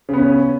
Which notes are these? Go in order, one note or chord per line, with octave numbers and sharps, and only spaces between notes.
C#3 B3 C#4